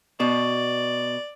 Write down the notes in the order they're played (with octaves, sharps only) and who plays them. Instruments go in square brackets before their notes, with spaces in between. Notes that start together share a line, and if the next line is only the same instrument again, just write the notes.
[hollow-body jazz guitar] B2 [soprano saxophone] D5